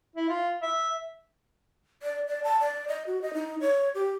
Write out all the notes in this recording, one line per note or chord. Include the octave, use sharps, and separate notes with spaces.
E4
F4
E5
D5
D5
A5
D5
D#5
F#4
D#5
D#4
C#5
G4